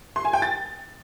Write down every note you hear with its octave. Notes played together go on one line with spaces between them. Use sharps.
C6
G#5
G5
A6